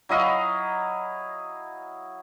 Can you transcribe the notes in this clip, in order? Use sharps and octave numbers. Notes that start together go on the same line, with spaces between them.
F#3 E4 D#5 F5